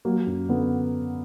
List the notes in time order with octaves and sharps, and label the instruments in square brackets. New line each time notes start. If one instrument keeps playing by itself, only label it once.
[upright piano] F#3 A#3
F#2
D3 B3